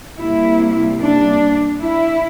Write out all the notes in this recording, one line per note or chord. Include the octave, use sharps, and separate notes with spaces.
C3 G3 A#3 E4
D4
E4